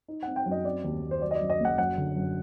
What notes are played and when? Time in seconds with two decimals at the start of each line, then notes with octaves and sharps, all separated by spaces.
0.08 D#4
0.23 F#5
0.27 C4
0.36 G5
0.46 F#2
0.51 D#5
0.64 C4 D5
0.84 D#2
1.02 D#2
1.11 C5
1.21 F#3 D5
1.31 D#5
1.35 D5
1.41 F#2
1.50 D#5
1.60 F#1 F#5
1.78 F#2 F#5
1.98 D3
2.16 F#2